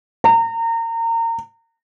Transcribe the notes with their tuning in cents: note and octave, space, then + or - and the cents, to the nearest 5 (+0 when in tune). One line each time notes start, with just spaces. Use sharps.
A#5 -30